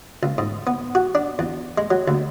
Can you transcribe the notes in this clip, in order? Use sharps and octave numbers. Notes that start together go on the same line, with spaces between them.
C#2
G#2
B3
F#4
D4
E2
G#3
F#3
D2